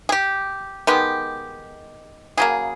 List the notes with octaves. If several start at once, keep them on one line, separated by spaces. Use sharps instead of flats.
G#4
G4
D#3 G#3 B3 G4
C#3 F#3 A#3 G#4